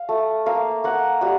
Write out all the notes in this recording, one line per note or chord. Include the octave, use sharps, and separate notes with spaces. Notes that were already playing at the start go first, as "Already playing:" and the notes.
Already playing: F5
A3
A#3 F5
A#3 F#5
G3 F#5